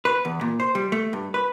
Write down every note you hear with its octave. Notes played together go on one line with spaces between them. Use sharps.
B4
E2
A#2
C5
G3
A3
G2
B4